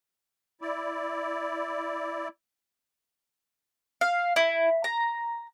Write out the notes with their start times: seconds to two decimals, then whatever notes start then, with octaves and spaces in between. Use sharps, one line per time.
0.61 E4 D5
4.01 F5
4.36 E4
4.84 A#5